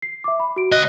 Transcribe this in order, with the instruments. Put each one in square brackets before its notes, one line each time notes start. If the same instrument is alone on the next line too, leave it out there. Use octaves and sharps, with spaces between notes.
[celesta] C7
E5 D6
B5
F#4 D7
[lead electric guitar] C#2 D#5 [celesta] F#6 D#7